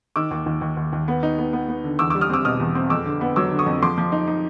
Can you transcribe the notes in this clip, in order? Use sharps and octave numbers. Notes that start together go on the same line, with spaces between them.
D#3 D6 E6
D#2
D#2
D#2
D#2
D#2
B3
D#4
B3
B3
B3
D3
E2 D6 E6
G3 D6 E6
D#6 F6
C4 D6 E6
B2 D#6 F6
E2
C4
F2 D6 E6
D3
B3
F#3 D6 E6
D3
C#6 D#6
F2
F3 C6 D6
F3
D#4
D#4